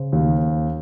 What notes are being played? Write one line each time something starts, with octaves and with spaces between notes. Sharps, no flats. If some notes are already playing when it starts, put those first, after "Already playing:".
Already playing: C#3 C5
D#2